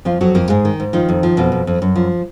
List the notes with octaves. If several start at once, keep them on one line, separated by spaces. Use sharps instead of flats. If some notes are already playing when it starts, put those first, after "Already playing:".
F2 F3 F4
F2 F#3 F#4
F2 A#3 A#4
G#2 G#3 G#4
D#3
G#2
D#3 F3 D#4
F2
F3
F2 B2 B3
F2
F2
F#2
F3